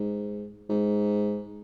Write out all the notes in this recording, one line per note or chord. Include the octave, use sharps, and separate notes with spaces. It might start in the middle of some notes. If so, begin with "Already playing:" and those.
Already playing: G#2
G#2